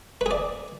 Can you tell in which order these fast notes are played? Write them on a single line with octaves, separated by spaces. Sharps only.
B4 G#4 D5